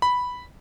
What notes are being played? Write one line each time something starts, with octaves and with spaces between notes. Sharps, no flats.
B5